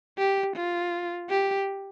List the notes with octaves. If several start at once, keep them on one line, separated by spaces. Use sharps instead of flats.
G4
F4
G4